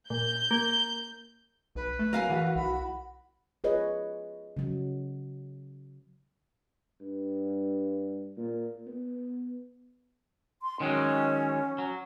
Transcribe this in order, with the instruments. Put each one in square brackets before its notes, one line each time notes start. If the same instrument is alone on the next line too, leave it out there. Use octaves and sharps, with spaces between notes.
[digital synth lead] A#2 [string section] G6
[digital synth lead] A#3
[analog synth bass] B1 [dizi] B4
[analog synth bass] A3
[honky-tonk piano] F#3 [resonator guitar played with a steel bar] A#4 F5 G#5
[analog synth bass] E3 [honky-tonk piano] E4 F#4
[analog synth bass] B1 [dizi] B5
[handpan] F4 G#4 B4 C#5 D#5
C#3 F#3
[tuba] G2
A#2
B3
[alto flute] C6
[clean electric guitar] D#3 F#3 G#3 [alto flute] C#4
[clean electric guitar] F#3